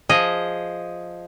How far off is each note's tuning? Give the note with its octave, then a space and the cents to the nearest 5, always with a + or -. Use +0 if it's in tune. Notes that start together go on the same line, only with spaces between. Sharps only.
F3 +0 G#4 +0 D#5 +0